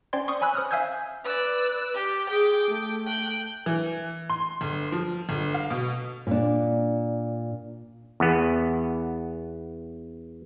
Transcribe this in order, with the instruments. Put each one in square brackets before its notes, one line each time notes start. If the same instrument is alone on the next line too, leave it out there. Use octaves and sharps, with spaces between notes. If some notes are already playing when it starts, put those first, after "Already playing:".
[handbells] C#4 C5 D5 G5 C6 G#6
C6 C#6 D#6
C#5 G#5 B5 E6 F#6
C5 D#6 F6 F#6
E5 F5 G#5 E6 G6 G#6
[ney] B4 [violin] D5 E6
[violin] G4
[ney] G#4 [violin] G5 D6
[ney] A3
[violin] G5 F#6
[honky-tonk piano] E3
C6
G1
F3
G1
F5
B2
[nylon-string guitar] A#2 D4
[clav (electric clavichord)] E2 B3